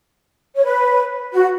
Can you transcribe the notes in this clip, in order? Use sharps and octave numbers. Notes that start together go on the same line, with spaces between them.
C#5
B4
F#4